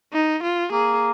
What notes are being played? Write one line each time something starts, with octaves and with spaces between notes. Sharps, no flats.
D#4
F4
A#3 G#4